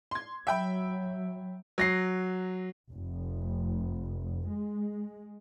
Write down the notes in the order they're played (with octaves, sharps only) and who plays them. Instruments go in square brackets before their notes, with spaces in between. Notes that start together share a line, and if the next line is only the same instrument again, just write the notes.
[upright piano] C6 G#6
[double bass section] F#3 [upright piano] E5 G5 B5
[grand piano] F#3 A#6 C7
[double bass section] F1
G#3